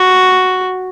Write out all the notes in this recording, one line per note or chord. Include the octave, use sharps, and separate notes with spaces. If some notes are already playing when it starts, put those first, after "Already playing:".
Already playing: F#4